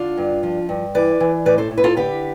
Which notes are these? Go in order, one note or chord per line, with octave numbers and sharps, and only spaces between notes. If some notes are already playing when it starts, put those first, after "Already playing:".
Already playing: D3 D4 F4
G2
F3
G2
E3 B4 D5
E3
A2 B4 D5
A4 C5
A2
B4
F4 A4
D3 G4 B4